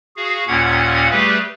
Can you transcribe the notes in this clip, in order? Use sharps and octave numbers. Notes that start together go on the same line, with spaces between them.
F#4 G#4 F5
D#2 A#2 A#3 C#4 F#5 G#6
G3 A3 G4 G#4 B4